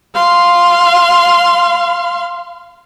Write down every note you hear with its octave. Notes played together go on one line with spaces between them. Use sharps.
F5 C6